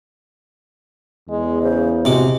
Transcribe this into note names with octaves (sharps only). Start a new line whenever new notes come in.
E2 G#3
C#3 C5
C3 G#3 F#4 D6